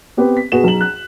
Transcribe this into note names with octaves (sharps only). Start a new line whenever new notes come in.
B3 C4 G4 B4
B6
B2 F#4 G#4 B4 E7
B1 G#4 A#5 F#7
F#6